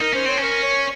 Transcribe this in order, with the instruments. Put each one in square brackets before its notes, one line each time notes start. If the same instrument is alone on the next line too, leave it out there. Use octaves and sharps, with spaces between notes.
[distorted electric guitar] D#4 [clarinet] A#4
[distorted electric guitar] C#4 [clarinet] C5
[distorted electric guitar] C4 [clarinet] C#5
[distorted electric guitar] C#4
[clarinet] A#4
C#5